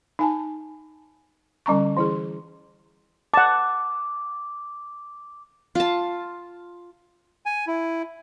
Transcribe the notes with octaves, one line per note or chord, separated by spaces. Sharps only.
D#4 G#5 A5
D3 G3 C#4 A#5 C#6
E3 E4 G#4
F#5 A5 D6
F4 A5
G#5
E4